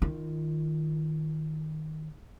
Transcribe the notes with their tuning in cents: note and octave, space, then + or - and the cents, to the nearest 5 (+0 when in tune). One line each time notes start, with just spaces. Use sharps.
D#3 +0 F4 -25